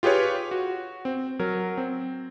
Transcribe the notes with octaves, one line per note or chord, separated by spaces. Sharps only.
F4 G4 G#4 B4 C#5
F#4
C4
F#3 A#4
C4